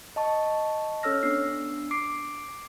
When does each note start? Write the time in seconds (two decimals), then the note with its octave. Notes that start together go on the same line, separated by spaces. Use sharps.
0.16 D#5 A5 C#6
1.03 C#4 A4 C#5 E6 F6 A#6
1.23 B3 D4 E6 C7
1.91 D6 C7 D7